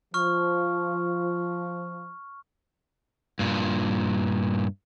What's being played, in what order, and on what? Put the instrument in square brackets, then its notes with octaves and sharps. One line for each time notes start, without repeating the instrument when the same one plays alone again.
[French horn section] F3 [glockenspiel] C#6 F6
[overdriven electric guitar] G2 A#2